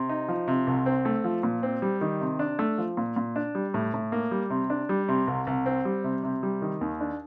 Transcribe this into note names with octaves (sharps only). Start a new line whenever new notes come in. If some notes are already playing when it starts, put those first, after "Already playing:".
Already playing: C3
D#4
F3
C3
C2
C4
A3
F3
A#2
C4
G3
D#3
C3
D4
A3
F3
A#2
A#2
D4
G3
A2
A2
A#3
G3
C3
D4
G3
C3
C2
C2
C4
G3
C3
C3
G3
D#3
D#2
D4